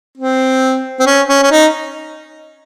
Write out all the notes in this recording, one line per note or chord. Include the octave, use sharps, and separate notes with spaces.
C4
C4
C#4
C#4
C#4
D#4